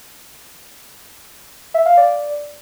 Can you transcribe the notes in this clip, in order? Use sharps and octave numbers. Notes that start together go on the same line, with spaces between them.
E5
F5
D5